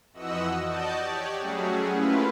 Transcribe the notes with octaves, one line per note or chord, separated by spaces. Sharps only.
F2 E3 F#4 D#5 F#5 E6
F#4 D5 D#5 A5 G6
G4 C#5 D5
F#3 G3 A3 C#4 F#4 G#4
A3 A#3 C#4 E4 F4 B4